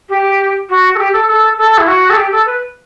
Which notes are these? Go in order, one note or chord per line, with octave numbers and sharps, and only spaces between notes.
G4
F#4
A4
G4
A4
A4
A4
E4
F#4
A4
G4
A4
B4